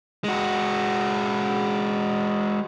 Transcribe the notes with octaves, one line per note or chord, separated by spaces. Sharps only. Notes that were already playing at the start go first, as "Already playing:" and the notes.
G#3 F#4